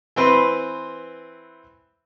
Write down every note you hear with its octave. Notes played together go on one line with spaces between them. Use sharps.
E3 C4 B4 C6